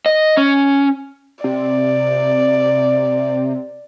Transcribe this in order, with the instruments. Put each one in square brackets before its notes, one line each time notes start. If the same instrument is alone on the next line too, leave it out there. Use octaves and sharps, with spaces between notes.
[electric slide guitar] D#5
C#4
[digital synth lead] C3 [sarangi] D5